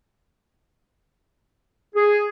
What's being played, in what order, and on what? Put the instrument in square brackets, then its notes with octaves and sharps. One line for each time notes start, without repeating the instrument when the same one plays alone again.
[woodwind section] G#4